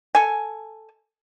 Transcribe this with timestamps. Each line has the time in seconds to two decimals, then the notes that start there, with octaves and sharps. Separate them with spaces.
0.15 A4 G#5